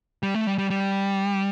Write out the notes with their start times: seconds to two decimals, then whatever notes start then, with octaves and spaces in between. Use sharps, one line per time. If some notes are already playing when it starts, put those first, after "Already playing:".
0.23 G3
0.34 A3
0.47 G3
0.58 G3
0.70 G3